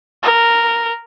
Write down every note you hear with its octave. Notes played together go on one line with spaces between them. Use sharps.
A#4